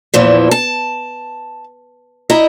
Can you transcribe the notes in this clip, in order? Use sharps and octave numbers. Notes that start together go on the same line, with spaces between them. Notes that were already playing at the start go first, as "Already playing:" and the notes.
E2 A#2 E3 F3
A5
E4 D#5 A#5